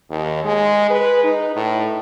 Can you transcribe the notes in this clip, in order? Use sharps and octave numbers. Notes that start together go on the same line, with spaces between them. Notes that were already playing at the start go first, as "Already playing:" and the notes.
D#2
G#3
B4
D#4
A2